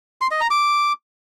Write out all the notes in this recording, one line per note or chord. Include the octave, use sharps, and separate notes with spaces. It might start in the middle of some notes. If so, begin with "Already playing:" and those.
C6
D#5
A#5
D6